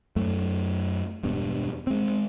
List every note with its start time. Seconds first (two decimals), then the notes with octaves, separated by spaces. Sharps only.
0.16 F#2 A3
1.23 E1 G2 B2
1.87 G#3 C4